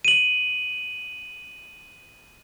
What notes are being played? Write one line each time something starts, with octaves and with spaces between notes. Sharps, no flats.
D#7 F#7